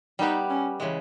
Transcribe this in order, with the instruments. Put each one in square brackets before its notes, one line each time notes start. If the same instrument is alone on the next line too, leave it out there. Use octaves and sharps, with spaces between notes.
[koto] G3 B3 G4 [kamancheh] D#4
[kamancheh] C#4
[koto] C#3 E3 G#3